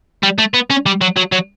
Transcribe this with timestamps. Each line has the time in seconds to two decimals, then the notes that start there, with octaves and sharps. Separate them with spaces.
0.23 G3
0.39 A3
0.54 B3
0.70 C#4
0.86 G3
1.01 F#3
1.17 F#3
1.32 F#3